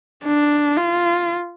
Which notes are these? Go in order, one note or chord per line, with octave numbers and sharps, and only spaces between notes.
D4
F4